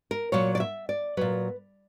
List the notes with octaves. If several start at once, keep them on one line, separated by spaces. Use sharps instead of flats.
A#4
A#2 F#3 C#5
D5
E5
D5
A#2 F#3 B4